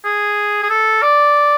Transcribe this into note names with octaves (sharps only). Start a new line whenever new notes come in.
G#4
G#4
A4
D5